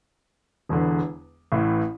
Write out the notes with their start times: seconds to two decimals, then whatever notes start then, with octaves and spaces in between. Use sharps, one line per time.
0.69 E1 E2 D3
1.52 A1 A2 E3